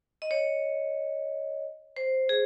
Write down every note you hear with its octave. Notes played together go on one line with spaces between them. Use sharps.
D#5
C#5
C5
G#4